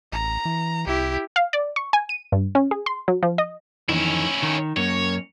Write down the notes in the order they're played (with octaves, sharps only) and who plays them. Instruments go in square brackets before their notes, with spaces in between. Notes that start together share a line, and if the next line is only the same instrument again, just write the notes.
[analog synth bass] A1 [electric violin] A#5
[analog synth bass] E3
[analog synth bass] C2 [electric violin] E4 G4
[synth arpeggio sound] F5
D5
C#6
G#5
D#7
G2
C#4
G#4
C6
F#3
F3
D#5
[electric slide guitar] F2 D#3 E3 [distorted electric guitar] C#4 E4
[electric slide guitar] D#3
[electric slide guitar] F#2 A#3 C#4 [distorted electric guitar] C#5